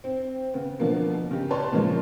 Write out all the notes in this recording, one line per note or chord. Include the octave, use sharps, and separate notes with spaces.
C4
C#3 B3
B2 D3 F3 A#3 B3
C#3 G4
B4 C#5 D5 A5 C6
A#2 C#3 F3 G#3